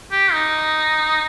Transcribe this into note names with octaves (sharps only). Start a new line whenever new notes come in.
G4
D#4